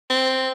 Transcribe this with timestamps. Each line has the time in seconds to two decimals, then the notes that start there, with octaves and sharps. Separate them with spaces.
0.10 C4